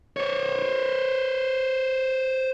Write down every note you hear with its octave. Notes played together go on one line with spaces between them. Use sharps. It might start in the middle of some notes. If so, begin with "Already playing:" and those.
C5 C#5